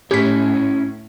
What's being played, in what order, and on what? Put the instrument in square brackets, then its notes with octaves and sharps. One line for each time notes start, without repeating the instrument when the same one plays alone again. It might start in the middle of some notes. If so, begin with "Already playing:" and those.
[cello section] A2 [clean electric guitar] C#4 E4 C#5 [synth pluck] G4 B6